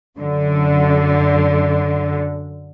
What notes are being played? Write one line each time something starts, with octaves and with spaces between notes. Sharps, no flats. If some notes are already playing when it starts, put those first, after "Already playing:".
F#2 D3